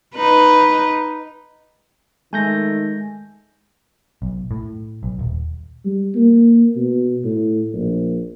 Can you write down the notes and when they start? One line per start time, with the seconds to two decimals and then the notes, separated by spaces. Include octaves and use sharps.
0.15 D#4 B4
2.33 D#3 G#3 A3 D#4 G#5 G6 A#6
4.22 B1
4.51 A2
5.03 B1
5.19 D#1
5.85 G3
6.15 A#3
6.76 B2
7.23 A2
7.73 A#1